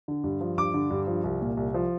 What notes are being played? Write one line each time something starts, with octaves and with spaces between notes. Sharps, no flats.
D3
G2
F3
G2 D6
D3
G2
F3
C2
A#2
C2
F3